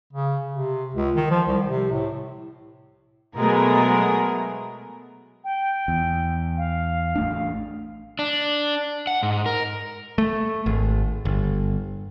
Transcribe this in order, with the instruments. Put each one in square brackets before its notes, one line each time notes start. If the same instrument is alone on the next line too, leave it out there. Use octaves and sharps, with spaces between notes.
[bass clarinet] C#3
C3
C#2
D#3
F3
C2
C3
A2
[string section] B2 F#3 G#3 A3 B3 A#4
[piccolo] G5
[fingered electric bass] E2
[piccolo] F5
[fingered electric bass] A1 A3 D4
[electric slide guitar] D4
F#5
G#2
A#4
[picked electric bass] A3
G#1
G1